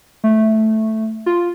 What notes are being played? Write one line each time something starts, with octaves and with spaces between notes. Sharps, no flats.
A3
F4